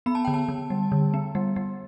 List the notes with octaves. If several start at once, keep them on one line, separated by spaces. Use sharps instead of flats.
B3 B5
A5
D3 G5
A5
D3
G3
D3
B3
G3
G3